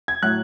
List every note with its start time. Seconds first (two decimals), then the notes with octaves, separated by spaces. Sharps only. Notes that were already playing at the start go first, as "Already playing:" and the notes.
0.08 G#6
0.23 A2 F#3 F#6